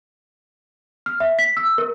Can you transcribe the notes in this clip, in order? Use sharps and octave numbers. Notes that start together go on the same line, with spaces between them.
F6
E5
B6
E6
A#4